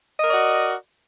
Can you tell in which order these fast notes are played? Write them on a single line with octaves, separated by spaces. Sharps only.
D#5 A#4 D5 F#4